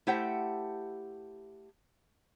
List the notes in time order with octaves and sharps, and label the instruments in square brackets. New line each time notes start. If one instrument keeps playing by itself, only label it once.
[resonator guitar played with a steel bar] A3 E4 G4 C5 F#5 G5